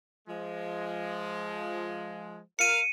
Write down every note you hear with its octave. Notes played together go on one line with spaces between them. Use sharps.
F3 G#3
A#4 F5 C#7 D#7